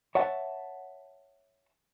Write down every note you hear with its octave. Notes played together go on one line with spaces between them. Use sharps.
C#5 E5 F#5 A5